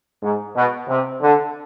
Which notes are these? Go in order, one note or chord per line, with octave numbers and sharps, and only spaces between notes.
G#2
B2
C3
D3